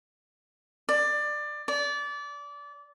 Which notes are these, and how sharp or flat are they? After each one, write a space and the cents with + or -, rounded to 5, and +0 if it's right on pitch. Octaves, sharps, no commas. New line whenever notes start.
D5 +20
D5 -25